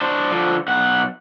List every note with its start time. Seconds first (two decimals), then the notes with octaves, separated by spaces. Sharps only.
0.01 D4 C5
0.30 D3 F3
0.68 B1 F#5